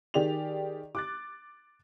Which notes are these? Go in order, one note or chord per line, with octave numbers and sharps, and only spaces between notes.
D#3 G4 G#4 D5 F7
D6 F#6 A6